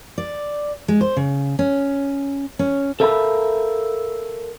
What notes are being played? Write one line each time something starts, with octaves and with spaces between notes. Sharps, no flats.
D5
G#3
C5
C#3
C#4
C#4
A4 A#4 E5 F5 A5 B5